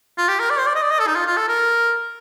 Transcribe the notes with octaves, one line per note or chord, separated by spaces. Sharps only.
F4
G4
A#4
D5
C5
D5
D#5
D5
D#5
A4
D#4
F4
F4
A4
A#4